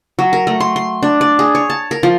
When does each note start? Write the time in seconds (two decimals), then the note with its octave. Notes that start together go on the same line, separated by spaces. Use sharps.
0.19 F#3
0.33 A#4
0.47 A3
0.60 C6
0.76 C6
1.03 D4
1.21 D5
1.39 G#4
1.55 C#5
1.70 A5
1.91 A#4
2.03 F3